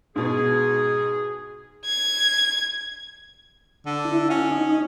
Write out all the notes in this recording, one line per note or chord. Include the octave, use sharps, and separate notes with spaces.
G#2 B2 G#4
G#6
D3
E4
C#4
D#4